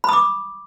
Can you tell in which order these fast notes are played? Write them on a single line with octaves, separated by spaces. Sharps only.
B5 D#6 D6